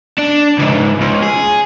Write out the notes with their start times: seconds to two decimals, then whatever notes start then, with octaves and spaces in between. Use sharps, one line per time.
0.18 D4
0.59 C#2 G#2
1.01 C#2
1.22 G#4